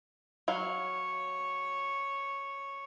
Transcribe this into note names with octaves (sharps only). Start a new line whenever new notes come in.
F#3 C#5 F5